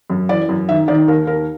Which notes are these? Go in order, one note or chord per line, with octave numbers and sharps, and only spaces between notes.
F#2
E3 D5
F#2
D#3 E5
D#3 D5
D#2 A#4
D#2 A#4